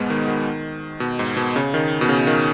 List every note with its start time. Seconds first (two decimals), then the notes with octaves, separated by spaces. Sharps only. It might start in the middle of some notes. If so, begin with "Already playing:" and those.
Already playing: G#2 B2 G#3 B3
0.10 D#3
0.28 D#3
1.00 B2
1.19 G#2
1.37 B2
1.56 C#3
1.74 D#3
2.01 B2
2.09 C#3
2.27 D#3